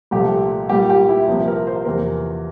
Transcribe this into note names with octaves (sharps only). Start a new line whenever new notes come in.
C2 A#2 F3 A3 G4
A#2 G3 A#3 G4
G4
E4
C2 C3 F3 A#3
A#4
C5
E2 C3 F3 A#3 A#4